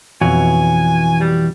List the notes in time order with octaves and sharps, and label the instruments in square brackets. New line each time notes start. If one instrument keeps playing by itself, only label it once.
[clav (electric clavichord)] F2 B2 [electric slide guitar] E3 F#4 C#5 [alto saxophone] G#5
[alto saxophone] G3